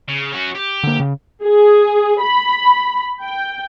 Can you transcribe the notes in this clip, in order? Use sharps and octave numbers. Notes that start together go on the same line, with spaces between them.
C#3
C#4 F#4
G4
D3 A#3
C#3
G#4
B5
G5